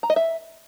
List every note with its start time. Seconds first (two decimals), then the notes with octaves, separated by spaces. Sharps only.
0.03 A#5
0.10 D#5
0.16 E5